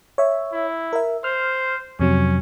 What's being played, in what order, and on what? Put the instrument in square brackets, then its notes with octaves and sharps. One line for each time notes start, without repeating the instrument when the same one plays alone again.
[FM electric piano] C#5 E5
[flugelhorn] E4
[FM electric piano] A#4 E5
[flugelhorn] C5 [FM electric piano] F6
[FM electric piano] F2 C3 F#3 [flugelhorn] C#4